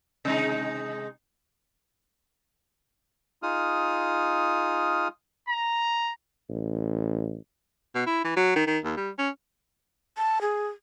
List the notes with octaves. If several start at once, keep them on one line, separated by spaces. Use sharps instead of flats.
C3 G#3 D#4
D#4 F4 G#4 D#6 F6
A#5
A1
B2
E4
E3
F#3
D#3
D#3
D#2
G3
C#4
A5
G#4